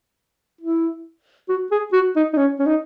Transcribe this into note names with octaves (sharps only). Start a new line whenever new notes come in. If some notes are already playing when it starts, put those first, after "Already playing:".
E4
F#4
G#4
F#4
D#4
D#4
C#4
C#4
D#4